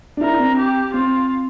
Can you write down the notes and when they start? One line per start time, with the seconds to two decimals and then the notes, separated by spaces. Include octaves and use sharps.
0.17 D4
0.21 E4 A#4
0.32 D4
0.39 C4
0.58 G4
0.93 C4 F4